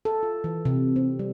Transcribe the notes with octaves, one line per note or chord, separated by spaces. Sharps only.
A4
F4
E3
C3
C4
G3